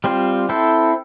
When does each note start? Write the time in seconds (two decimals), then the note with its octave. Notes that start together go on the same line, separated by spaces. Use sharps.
0.04 G3 C4 F4 C5
0.49 C4 E4 A4 C5